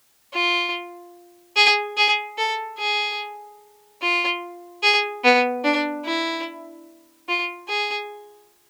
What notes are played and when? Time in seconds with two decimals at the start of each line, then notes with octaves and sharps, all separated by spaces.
0.33 F4
1.56 G#4
1.97 G#4
2.38 A4
2.78 G#4
4.01 F4
4.83 G#4
5.24 B3
5.64 D4
6.05 E4
7.28 F4
7.68 G#4